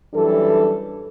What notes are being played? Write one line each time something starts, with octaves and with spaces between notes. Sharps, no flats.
F#2 E3 G3 D4 A4